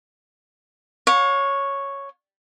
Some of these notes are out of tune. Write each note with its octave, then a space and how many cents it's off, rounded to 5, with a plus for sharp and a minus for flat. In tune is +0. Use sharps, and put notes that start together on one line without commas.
C#5 +0 F5 +45